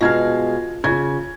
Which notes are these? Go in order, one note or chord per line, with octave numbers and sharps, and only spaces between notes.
B2 G#3 F4 F5 G#6
C#3 F4 G#6